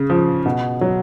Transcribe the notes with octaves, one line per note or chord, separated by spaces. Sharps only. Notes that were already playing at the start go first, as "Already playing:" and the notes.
Already playing: C#3
F3
B2
F#3